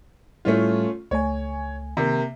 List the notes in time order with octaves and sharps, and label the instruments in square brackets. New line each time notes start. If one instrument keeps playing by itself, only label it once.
[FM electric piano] A2 G3 E4 [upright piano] A3 C#4 F4
[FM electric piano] C#2 A3 G#5 [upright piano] C#5
[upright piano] C3 A#3 [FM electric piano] D#3